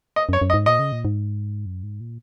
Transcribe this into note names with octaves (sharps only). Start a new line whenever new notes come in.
D#5
F#2
C#5
F#2
D#5
G#2
A#2 D#5
C#3
A#2
G#2
F#2
G#2
A#2